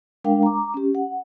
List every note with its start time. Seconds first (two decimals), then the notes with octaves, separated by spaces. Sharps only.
0.24 G#3 D4 A#4 F5 G5
0.43 A#5 D6
0.74 C#4 G4
0.95 F#5